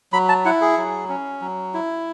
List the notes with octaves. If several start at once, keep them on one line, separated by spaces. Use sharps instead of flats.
F#3 B5
A5
E4 F#5
G#4
F#3
C#4
F#3
E4